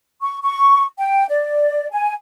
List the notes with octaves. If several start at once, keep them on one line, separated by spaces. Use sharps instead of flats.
C#6
C#6
G5
D5
G#5